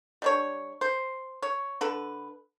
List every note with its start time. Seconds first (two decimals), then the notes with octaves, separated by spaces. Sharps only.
0.22 G3 D4 C#5
0.81 C5
1.42 C#5
1.81 D3 A4 B4